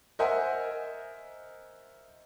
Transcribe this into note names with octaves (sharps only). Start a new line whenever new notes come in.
A#4 C5 D#5 E5 F#5 G#5